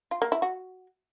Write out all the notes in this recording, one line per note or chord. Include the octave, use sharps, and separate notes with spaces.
F4
A#3
E4
F#4